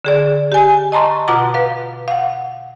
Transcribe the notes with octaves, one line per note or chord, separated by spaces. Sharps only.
D3 G#4 D5
G4 G#5
D#5 A5 A#5 C6 C#6
B2 F4 F#4 F#5 A#5 D6
B4 F5
F5 F#5